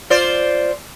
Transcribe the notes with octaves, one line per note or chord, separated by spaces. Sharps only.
F4 C5 D5